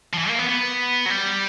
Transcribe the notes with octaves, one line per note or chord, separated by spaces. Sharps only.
F3
E3
A#3
B3
B3
F#3
G3